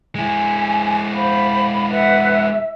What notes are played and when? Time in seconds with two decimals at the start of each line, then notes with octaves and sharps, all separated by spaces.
0.15 G#3 E4 G#5
1.13 C5 F5 B5
1.91 B4 E5 F#5